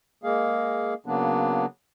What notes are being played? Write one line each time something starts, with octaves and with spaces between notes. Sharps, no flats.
G#3 A#3 G#4 F5
C#3 F#3 A#3 B3 D4